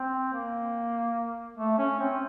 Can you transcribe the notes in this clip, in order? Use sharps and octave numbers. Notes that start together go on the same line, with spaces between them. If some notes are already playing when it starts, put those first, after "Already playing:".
Already playing: C4
A#3
A3
C#4
C4